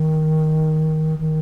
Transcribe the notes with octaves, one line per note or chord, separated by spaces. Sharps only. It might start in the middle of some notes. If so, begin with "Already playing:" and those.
Already playing: D#3
D#3